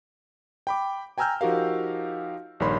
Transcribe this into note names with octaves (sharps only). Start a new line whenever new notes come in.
G5 B5 D6
G5 G#5 A#5 E6 F6 G6
F3 D#4 F#4 G4 A#4 F5
A#1 G2 D#3 C#5 B5 C6